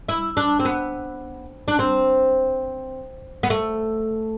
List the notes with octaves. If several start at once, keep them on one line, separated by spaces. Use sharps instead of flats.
E4
D4
C4
B3
D4
C4
B3
A3